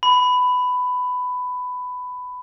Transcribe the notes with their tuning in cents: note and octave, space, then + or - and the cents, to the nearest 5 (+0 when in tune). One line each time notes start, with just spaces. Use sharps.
B5 +15